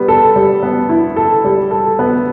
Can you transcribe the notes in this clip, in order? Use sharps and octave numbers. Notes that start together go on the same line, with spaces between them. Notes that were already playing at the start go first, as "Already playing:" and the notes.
Already playing: G3 B3
A4
G3
B3
E4
A4
G3
A4
B3